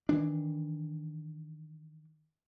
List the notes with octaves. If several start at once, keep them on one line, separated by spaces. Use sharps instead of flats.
D#3 E3 D4